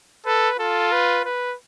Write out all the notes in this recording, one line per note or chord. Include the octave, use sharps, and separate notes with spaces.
A4 B4
F4 A4
B4
B4